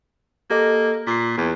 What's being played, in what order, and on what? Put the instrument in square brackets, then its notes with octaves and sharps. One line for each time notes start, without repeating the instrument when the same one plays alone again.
[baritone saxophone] A#3 [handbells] G4 A4 D#5
[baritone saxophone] A#2 [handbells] B6 C7
[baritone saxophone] E2